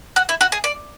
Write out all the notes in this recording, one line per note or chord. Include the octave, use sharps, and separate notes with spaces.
F#4
E4
F#4
G#4
D5